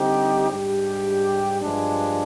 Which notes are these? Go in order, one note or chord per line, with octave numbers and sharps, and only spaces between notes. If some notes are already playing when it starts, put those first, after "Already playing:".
Already playing: D3 G3 C4 D#4 G4
G#2 G3 D4 G4
G2 F3 G#3 D4